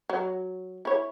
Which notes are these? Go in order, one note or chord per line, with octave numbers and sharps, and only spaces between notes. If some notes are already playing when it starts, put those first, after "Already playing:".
F#3
E4 C#5